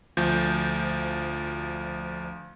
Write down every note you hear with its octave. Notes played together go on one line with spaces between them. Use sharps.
D2 F3 G6